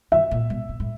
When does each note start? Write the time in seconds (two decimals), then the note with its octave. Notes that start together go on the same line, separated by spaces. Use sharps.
0.12 D#3 E5
0.31 A#2
0.50 B2
0.69 A#2
0.80 A2